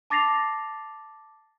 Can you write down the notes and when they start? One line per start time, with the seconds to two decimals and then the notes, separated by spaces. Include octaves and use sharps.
0.10 A5 D6 A6 A#6 C7 F7